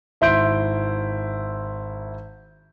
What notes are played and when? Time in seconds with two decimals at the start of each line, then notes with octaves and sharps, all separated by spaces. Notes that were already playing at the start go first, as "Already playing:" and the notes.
0.21 G#1 E4 C6 G6 D7